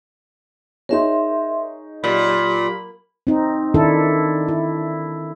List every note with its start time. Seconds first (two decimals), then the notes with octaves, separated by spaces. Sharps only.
0.89 D#4 G#4 A#4 C#5 E5 C6
2.04 A#2 F#3 G4 B5
3.27 C4 D#4
3.74 D#3 D4 E4 A4
4.48 E4